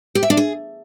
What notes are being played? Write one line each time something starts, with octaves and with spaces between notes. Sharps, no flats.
G4
E5
D4
G#4